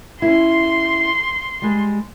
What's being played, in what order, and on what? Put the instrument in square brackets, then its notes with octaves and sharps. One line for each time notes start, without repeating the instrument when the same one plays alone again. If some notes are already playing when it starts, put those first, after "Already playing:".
[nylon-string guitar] C#4 E4 [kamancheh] C6
[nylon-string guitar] G3 G#3